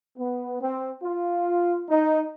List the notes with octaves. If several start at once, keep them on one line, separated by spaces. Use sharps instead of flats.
B3
C4
F4
D#4